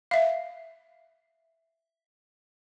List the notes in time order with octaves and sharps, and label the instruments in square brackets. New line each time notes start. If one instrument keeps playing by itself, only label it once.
[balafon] E5 F5